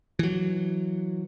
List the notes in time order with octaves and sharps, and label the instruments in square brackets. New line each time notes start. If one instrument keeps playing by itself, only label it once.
[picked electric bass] E3 F#3